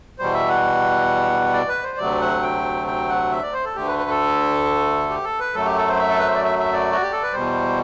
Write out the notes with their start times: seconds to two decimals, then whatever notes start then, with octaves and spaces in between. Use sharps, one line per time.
0.19 E2 B2 G3 C5
0.34 E5
0.49 F#5
1.54 D5
1.69 B4
1.84 C5
1.98 D2 C3 F#3 A3 D5
2.21 F#5
2.42 G5
2.87 G5
3.09 F#5
3.31 E5
3.42 D5
3.53 C5
3.65 A4
3.76 D2 D3 A3 G4
3.87 B4
3.99 B4
4.10 A4
5.10 G4
5.24 A4
5.40 B4
5.54 F#2 F#3 A3 A4
5.66 G4
5.77 A4
5.88 C5
5.99 E5
6.09 A4
6.19 B4
6.27 C5
6.35 D5
6.44 E5
6.59 E5
6.73 D5
6.92 F#4
7.02 G4
7.13 A4
7.23 B4
7.32 E2 B2 G3 C5